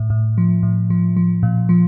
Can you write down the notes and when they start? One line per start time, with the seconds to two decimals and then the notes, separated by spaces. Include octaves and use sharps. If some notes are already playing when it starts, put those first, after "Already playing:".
Already playing: A2
0.10 A2
0.38 F3
0.63 A2
0.90 F3
1.16 F3
1.43 A#2
1.69 F3